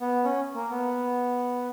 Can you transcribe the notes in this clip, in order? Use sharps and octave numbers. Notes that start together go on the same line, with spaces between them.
B3
C#4
A#3
B3